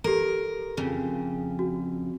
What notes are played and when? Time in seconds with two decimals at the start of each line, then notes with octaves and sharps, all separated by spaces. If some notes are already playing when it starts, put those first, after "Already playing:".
0.04 G4 A4 A#4
0.77 F2 C#3
1.59 F#4